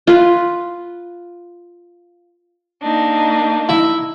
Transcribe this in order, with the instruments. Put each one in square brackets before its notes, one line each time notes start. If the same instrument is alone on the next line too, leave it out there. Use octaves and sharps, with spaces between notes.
[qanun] F4 B4
[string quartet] A#3 D4 D#4
[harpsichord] E4